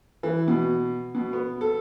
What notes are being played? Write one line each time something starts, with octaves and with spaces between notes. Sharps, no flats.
E3
B2
B2
B3
A4